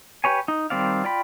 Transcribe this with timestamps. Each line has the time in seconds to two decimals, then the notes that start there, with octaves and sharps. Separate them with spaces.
0.24 G4 B4 C#5 G#5
0.48 D#4
0.70 D#3 G3 C4 D5 F5
1.04 F4 D5 G5 B5